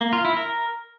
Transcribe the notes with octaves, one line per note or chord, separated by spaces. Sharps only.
A#3
F4
E4
A#4